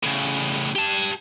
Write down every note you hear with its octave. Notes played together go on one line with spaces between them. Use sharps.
A2 C#3
G4 A5